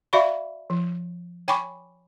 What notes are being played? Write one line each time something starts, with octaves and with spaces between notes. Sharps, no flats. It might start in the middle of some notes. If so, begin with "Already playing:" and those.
F#4 D5 E5 F5 B5 C#6
F3
C#5 G5 G#5 B5 C#6 D6